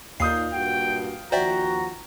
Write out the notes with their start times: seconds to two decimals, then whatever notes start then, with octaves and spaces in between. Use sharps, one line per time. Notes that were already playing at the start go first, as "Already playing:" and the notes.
0.20 D#2 A#2 D#4 F5 D#6 G6 C7
0.53 G2 A#2 F#4 G5
1.32 D#2 F3 F#4 C5 D5 E5 G5 A#5